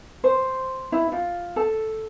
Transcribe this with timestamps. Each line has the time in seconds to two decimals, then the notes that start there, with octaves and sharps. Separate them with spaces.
0.24 C5
0.92 E4
1.12 F4
1.56 A4